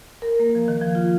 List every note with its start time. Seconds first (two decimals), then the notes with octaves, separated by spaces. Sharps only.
0.22 A#4
0.39 A#3
0.55 F3
0.68 D#3
0.81 F3
0.95 F4